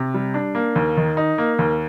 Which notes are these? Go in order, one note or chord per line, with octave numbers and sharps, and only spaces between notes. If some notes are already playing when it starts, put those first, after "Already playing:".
Already playing: C3
G3
D4
A#3
D#2
D#3
D#4
A#3
D#2